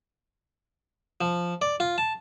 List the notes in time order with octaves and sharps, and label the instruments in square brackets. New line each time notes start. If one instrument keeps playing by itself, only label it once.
[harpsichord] F3
D5
F4
A5